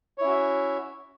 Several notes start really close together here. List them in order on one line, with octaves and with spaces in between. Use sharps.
C#5 E4 C#4 F#4 E5